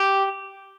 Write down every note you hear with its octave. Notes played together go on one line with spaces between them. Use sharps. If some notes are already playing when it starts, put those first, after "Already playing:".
Already playing: G4